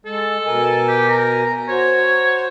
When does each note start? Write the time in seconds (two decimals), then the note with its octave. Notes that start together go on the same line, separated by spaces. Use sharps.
0.05 G#3 A4
0.46 B2 A#4 G#5
0.89 G4
1.09 A#5
1.68 F#4 C5 C#5